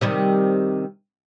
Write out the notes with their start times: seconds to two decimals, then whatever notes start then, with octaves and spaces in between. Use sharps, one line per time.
0.01 C3 D#3 G3